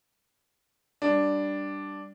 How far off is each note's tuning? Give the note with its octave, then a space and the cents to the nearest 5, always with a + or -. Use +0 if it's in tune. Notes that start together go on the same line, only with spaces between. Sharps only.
G3 +0 D4 +0